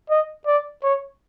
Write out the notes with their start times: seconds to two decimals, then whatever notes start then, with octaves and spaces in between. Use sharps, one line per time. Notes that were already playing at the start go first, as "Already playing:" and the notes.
0.10 D#5
0.47 D5
0.83 C#5